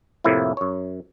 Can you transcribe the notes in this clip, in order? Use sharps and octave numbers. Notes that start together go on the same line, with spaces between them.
F2 A2 C3 A#3 E4
F#2 C#5